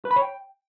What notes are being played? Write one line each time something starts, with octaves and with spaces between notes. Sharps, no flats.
B4
B5
C#5
G5